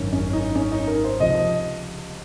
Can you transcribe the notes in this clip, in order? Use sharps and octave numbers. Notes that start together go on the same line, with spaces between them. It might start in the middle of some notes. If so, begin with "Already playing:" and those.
Already playing: G#1 F#2 D#3
C#4
D#4
C#4
D#4
A#4
C5
C#2 C3 F3 D#5